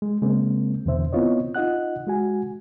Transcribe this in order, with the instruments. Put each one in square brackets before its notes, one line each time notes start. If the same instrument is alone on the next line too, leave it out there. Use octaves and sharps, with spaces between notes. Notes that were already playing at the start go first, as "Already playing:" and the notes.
[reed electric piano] G#3
C#3 G#3 A#3 C4
E2 B2 D3 E3 C5 E5
B3 C4 E4 F4 C#5 D#5
D#4 F4 D#5 F#5 F#6
G#3 F#4 G#5